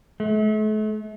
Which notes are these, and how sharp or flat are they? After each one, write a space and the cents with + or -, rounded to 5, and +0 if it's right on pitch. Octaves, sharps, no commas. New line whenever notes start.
A3 -40